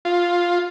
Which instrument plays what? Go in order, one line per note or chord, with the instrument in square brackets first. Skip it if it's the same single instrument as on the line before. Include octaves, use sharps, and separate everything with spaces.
[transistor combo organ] F4